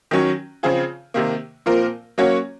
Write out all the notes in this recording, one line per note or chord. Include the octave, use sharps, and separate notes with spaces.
D#3 F#3 C#4
C#3 F3 C4 F4 G#4
C3 D#3 A#3
A#2 F3 C4 F4 A#4
F#3 A#3 C#4 F#4 C#5